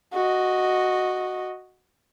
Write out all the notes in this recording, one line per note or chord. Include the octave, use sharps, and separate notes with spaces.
F#4 D#5